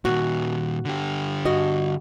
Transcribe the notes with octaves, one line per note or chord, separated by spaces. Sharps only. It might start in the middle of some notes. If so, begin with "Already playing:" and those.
A#2 D#3 F#4
D3 G4
G2 F#4 D#5